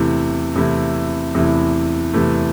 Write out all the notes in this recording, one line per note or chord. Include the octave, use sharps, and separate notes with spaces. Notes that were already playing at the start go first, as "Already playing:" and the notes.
Already playing: E2 C3 E3 A3 E4
E2 C3 E3 A3 E4
E2 C3 E3 A3 E4
E2 C3 E3 A3 E4